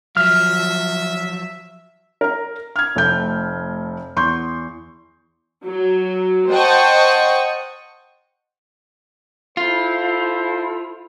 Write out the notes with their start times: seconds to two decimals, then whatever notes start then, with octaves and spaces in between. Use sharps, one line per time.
0.17 F3 F#3 E5 F6
2.21 A#4 A#5
2.76 F6 G#6
2.96 F1 A3 G6
4.16 E2 C6 C#6 G6
5.64 F#3
6.51 C5 D#5 F#5 G5 A5 C#6
9.57 E4 F4 A4 C5